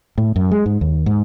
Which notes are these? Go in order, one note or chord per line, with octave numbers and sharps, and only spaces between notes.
A2
F#2
G#3
G#2
D#2
G#2